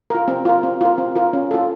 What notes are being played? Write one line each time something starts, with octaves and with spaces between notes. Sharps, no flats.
F4 A#4
C4
F4 A#4
C4
F4 A#4
C4
F4 A#4
C#4
F4 A4